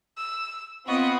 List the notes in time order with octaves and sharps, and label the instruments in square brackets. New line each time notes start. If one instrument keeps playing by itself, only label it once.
[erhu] E6
[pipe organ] B3 C#6 [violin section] C4 F4 B5 [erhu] D#5